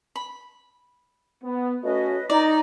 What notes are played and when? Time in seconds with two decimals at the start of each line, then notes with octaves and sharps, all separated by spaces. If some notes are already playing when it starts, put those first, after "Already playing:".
0.16 B5
1.43 B3
1.83 A3 C#4 F#4 B4 D#5
2.30 D#4 D5 A#5